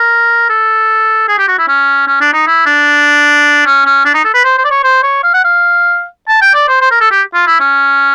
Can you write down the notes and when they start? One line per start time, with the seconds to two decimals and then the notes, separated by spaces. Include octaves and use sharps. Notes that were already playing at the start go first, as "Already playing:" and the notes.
Already playing: A#4
0.49 A4
1.28 G#4
1.38 G4
1.48 F#4
1.58 E4
1.68 C#4
2.07 C#4
2.20 D4
2.33 D#4
2.47 E4
2.66 D4
3.66 C#4
3.85 C#4
4.05 D4
4.14 D#4
4.24 A4
4.34 B4
4.44 C5
4.58 C5
4.64 D5
4.71 C#5
4.83 C5
5.03 C#5
5.23 F5
5.34 F#5
5.44 F5
6.28 A5
6.41 G5
6.54 D5
6.68 C5
6.81 C5
6.91 A#4
7.00 A4
7.11 G4
7.34 F4
7.47 E4
7.60 C#4